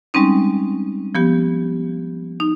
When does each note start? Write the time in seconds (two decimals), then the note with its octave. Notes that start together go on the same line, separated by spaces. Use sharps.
0.14 G3 G#3 C4 C#4 D#4
1.15 F3 B3 G4
2.40 D#4